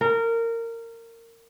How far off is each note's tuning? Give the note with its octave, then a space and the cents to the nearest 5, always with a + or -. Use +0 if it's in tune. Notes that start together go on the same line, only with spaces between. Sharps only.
A#4 -20